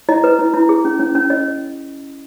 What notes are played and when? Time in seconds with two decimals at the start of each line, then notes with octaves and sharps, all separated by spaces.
0.09 E4 D#5
0.24 B4
0.39 E4
0.54 E4
0.69 G#4
0.85 C#4
0.99 C#4
1.15 C#4
1.30 C#4 D#5